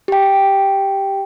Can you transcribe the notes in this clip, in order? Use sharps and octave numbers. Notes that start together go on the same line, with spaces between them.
G4 G5